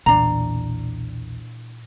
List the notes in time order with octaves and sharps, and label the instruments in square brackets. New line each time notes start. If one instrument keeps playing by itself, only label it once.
[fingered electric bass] B1 E2 [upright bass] A#2 E3 [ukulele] D4 A#5